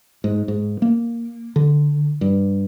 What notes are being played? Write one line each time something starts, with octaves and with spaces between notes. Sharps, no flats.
G#2
G#2
A#3
D3
G2